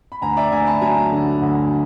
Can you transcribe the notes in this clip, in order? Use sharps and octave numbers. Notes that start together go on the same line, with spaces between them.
B5
D2 G#5 A#5
D5 E5
D2 G#5 A#5
A5 B5
F#3 G#5 A#5
D3
D2